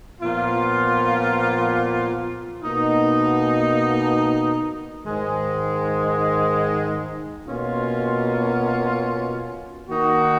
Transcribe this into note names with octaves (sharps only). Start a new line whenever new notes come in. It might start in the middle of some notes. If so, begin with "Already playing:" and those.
A#2 F3 B3 F4
B2 A#3 D#4
G#2 D#3 G#3
B2 A#3 C#4 F4
D#3 A#3 D#4 F#4